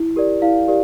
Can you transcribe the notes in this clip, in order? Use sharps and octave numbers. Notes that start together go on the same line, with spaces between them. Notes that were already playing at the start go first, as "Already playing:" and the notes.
Already playing: E4
G4 A#4 D5
E4 F5
G4 A#4 D5